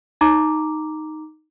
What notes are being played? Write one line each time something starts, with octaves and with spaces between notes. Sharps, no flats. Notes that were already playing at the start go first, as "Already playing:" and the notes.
D#4 A#5 D6